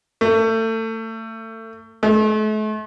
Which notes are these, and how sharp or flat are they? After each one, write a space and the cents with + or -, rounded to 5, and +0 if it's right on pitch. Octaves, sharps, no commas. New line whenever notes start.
A3 +30
A3 -40